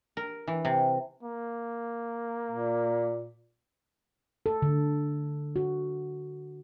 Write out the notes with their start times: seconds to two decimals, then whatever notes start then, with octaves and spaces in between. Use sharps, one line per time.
0.17 A#4
0.47 E3
0.65 C3
1.23 A#3
2.51 A#2
4.46 A4
4.62 D3
5.56 F#4